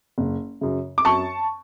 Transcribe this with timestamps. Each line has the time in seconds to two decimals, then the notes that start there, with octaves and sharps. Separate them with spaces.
0.18 F#1
0.61 F#2 C#3
0.98 D6
1.05 F#2 A5 C#6